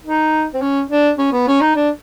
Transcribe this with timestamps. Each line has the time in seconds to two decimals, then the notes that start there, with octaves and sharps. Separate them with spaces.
0.04 D#4
0.54 C4
0.62 C#4
0.90 D4
1.18 C#4
1.33 B3
1.47 C#4
1.61 D#4
1.76 D4